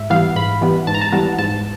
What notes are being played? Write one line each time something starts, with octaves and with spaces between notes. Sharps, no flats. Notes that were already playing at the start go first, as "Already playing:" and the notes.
Already playing: G#2 E5
E3 G3 B3 F5
G#2 B5
E3 G3 B3
G#2 A5
A#5
A5
E3 G3 B3
G#2 A5